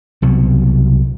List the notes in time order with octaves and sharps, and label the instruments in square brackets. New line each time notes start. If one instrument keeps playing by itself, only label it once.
[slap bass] C2 B2 F#3